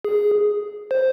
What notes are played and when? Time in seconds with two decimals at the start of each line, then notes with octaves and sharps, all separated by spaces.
0.05 G#4
0.91 C5